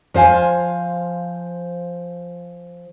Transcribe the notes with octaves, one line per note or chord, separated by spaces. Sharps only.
F3 C5 F5 G#5